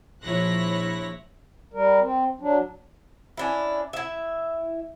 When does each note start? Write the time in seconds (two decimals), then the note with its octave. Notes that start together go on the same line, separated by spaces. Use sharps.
0.22 A#1 F3 E4 C#5 F#6 A#6
1.73 G3 A#4
2.00 C4
2.40 F#3 D4
3.37 C#4 D4 E4
3.93 E4 E5